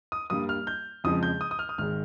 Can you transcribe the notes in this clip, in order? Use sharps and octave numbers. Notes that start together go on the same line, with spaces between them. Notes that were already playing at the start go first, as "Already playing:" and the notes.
D#6
G2 G3 A#3 D#6
F6
G6
F2 C#3 F3 G#3 D#6
G6
D#6
D#6
F6
D#6
G#1 G#2 D#3 G#3 F6